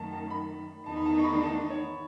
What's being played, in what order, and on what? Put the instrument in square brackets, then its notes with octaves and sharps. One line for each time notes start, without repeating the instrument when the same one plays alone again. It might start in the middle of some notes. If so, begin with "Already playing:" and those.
Already playing: [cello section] F#2 D#3 A3 [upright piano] A5
[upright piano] A5
B5
[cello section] E2 D#3 A3 D#4 [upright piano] A5
[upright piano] B5
A5
C#6
B5
B5
A5
C#5